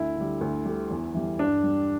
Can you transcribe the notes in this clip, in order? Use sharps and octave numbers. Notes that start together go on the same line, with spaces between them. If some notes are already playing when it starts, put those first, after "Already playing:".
Already playing: D2 E4
D3 G3
D2
D3 G3
E2
E3 G3
G2 D4
G3